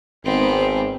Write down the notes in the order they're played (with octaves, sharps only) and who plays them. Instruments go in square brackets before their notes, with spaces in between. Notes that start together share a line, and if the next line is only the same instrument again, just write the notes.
[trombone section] G#1 [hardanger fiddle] B3 C4